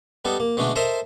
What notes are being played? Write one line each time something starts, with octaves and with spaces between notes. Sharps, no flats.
G3 B3 D#4 A4
A#3
B2 D3 G#3 A3 D4
A4 A#4 C5 D#5 E5 A#5